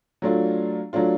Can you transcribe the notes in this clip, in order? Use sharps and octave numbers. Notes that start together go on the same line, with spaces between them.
F#3 A3 D4 F4
F#3 A3 D4 F4